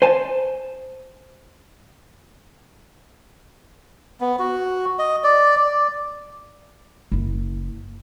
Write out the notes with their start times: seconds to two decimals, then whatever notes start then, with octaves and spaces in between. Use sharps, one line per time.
0.02 C5 G#5 A5
4.20 B3
4.39 F#4
4.99 D#5
5.24 D5
5.57 D5
7.12 F#1 E4